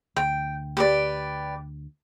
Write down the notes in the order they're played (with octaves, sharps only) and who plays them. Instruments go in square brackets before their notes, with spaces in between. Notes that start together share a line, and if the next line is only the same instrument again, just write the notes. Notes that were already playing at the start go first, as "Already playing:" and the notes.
[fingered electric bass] D2 [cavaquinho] G5
[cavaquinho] G4 B4 D5